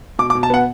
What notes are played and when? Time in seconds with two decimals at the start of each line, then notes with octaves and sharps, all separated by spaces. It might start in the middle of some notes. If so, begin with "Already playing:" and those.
0.19 B2 D6
0.30 D6
0.35 B2
0.43 A5
0.50 B3 F#5